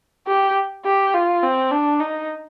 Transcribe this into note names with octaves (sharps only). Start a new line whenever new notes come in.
G4
G4
F4
C4
D4
D#4